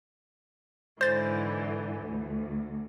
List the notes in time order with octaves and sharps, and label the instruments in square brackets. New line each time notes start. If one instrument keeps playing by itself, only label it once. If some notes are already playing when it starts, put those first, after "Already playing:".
[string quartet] G#2 D3 E3 [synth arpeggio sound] C5 A6
[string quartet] D2